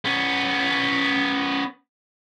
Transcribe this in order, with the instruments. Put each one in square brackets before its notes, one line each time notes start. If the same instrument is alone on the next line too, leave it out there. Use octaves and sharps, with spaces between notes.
[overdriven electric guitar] B3 C#4